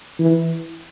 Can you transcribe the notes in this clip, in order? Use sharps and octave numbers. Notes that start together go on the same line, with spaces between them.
E3